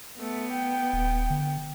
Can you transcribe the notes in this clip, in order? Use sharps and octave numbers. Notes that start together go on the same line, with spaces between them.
A3 B3
G5
D#1
D3